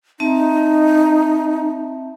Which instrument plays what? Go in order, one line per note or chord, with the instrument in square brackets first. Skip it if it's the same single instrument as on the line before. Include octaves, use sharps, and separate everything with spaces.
[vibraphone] C4 E5 A5 [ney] D#4